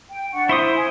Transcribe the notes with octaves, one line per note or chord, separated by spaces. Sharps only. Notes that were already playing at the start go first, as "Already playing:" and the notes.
G5
D4 F#5 C#6
E4 C5 C6 D#6
G#5